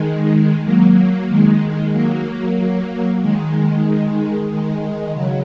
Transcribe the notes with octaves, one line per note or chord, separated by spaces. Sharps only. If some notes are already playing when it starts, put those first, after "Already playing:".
Already playing: D#3 G#3
F#3 A#3
D#3 G#3
F#3 A#3
D#3 G#3
D#3 G#3
C#3 F#3